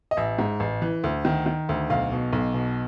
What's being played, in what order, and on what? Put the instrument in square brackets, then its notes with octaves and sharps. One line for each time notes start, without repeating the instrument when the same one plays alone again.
[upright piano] D#5
A1 E5
G#2
A1
E3
D2
D#3
D#3
D2
B1 F5
B2
B1
B2